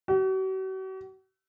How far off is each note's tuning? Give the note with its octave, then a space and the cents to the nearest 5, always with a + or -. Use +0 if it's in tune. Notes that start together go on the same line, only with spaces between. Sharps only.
F#4 +45